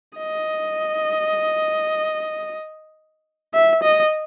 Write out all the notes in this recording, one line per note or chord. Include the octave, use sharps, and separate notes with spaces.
D#5
E5
D#5